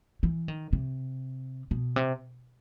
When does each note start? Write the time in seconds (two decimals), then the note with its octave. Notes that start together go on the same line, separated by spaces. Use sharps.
0.23 E3
0.48 D#3
0.73 C3
1.71 B2
1.96 C3